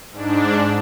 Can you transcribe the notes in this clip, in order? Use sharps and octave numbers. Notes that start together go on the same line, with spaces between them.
G#2 D4